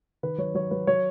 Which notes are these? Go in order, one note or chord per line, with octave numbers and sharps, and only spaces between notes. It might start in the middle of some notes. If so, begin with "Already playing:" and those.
D#3 B4
F#3 C#5
F#3 C#5
F#3 B4
F#3 C#5